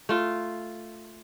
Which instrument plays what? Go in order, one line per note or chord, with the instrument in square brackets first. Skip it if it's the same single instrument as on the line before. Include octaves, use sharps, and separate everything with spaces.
[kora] A3 F4